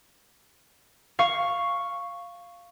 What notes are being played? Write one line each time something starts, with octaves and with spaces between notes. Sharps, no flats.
F5 C#6